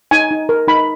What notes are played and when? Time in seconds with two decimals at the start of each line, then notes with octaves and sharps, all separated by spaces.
0.11 D#4 G#5
0.31 D#4
0.49 A#4
0.68 D#4 B5